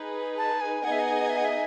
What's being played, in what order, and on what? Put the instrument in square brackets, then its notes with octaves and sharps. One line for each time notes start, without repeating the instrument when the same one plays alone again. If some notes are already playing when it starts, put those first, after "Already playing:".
Already playing: [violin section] D#4 G#4 B4
[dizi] A5
G#5
[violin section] B3 D#4 G#4 D#5 G#5 [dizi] F#5
[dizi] E5
F#5
E5
F#5
E5